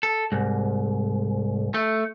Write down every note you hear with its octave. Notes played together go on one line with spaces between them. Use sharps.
A4
C2 G#2
A3